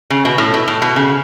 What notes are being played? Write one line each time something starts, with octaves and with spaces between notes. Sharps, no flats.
C#3
B2
A2
B2
A2
B2
C#3